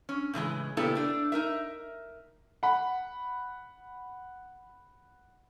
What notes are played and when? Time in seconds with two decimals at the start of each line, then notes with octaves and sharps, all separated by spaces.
0.09 C#4
0.34 A2 C#3 E3 G#3
0.77 A#2 C#3 B3 E4 G4 A4
0.95 A3 D4
1.32 D#4 A#4 E5
2.63 F#5 B5